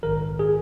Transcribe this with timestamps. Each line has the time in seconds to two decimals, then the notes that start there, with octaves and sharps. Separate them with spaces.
0.03 A#1 G#2 D#3 A#4
0.39 G#4